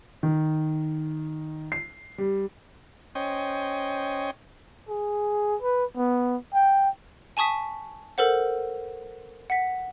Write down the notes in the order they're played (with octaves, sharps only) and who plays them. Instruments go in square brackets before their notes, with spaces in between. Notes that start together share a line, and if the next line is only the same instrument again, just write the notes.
[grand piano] D#3
C7
G3
[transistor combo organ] C#4 C5 C#5 D#5 G5
[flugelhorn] G#4
B4
B3
G5
[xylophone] G#5 A5 C#6 D#6 B6
A4 A#4 C5 F#5
F#5 B6